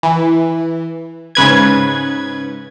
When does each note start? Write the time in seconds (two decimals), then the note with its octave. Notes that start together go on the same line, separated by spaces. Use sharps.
0.03 E3
1.35 G#2 C#3 B4 G#6